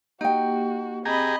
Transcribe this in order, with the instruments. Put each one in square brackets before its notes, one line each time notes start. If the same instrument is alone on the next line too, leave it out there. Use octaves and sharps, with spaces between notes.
[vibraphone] A#3 G4 [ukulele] D#4 G5 [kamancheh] F#4
[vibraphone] C4 [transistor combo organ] G4 G#4 A#5 [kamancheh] D#5 B5